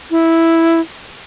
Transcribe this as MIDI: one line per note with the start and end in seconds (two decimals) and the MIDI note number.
0.11 0.80 64